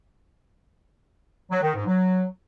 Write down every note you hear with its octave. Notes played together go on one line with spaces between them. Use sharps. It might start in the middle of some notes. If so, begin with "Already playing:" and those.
F#3
D#3
G#2
F#3